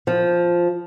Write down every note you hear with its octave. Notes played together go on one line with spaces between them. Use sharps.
F3